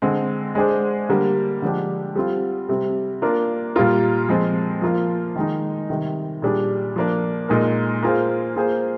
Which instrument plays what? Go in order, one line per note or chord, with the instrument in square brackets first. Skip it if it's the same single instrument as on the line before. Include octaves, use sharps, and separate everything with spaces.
[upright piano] D3 G#3 C4
G#3 D4 G#4 C5
D3 G3 A#3
D3 F3 G#3 D4 G4
G3 C4 F4
C3 G3 C4
A#3 D4 F4 A#4
A#2 G3 A#3 F4 A#4
F3 G#3 C4
F3 A#3 F4
D#3 G#3 D#4
C3 D#3 G3
A#2 G3 D4 G#4
F3 A#3 D4
A#2 G#3 D#4 A#4
A#3 F4 G#4 C5
A#3 F4 G#4 C5